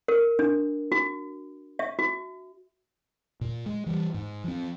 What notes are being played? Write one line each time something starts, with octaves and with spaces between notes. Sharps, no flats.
A#4
D4
F#4
E5
F#4
A#2
G#3
E3 G3
G#2
F3 C4